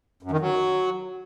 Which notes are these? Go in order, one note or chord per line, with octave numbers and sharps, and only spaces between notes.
F#2
D#3
F#3